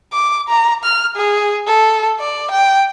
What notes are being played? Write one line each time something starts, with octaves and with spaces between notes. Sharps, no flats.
D6
A#5
F6
G#4
A4
D5
G5